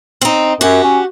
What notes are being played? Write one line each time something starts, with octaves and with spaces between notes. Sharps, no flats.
C4 D#4
F#2 F#4 G4
C#4